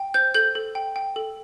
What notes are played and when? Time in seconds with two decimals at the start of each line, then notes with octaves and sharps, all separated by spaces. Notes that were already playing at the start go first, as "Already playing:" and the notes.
Already playing: G5
0.14 C5 G6
0.34 A4 G6
0.55 A4
0.75 G5
0.96 G5
1.16 A4